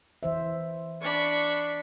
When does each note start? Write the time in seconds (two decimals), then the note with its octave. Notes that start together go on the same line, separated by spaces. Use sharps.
0.23 E3 C5 E5
1.02 D4 B5 C#6